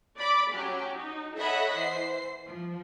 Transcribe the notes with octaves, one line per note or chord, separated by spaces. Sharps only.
D5 B5 D6
F#3 C#4 G4
D#4
A4 C#5 D#5 E5 F#5 B5
E3 C5 C7
F3